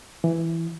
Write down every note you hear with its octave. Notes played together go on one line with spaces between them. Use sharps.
E3